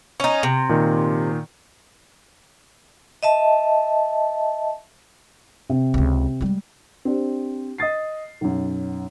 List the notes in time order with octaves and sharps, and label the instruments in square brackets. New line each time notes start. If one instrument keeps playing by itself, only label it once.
[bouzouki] C#4 D#4
C3
[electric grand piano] A#2 D#3
[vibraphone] D#5 E5 A5
[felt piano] C3
[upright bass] C#2 C#3
G3 G#3
[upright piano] C4 D4 G4
D#5 D#6 A6 C7
B1 F#2